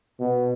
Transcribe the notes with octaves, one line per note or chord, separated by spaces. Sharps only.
B2